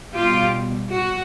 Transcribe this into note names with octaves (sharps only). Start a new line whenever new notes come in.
B2 G3 F4 G4
F#4